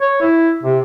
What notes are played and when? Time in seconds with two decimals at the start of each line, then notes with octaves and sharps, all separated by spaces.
0.01 C#5
0.22 E4
0.63 C3